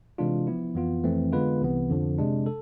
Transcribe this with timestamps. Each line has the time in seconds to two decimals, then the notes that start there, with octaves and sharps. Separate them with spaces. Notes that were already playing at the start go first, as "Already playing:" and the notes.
0.18 C3 E3 G#3 D4 F4
0.47 F3 B3 E4
0.75 F2 E3 B3 F4
1.04 F2 E3 A3 C4
1.32 D3 G#3 B3 F4 B4
1.61 C2 C3 E3 B3
1.89 F2 D3 F3
2.18 C3 G#3 D4
2.46 A4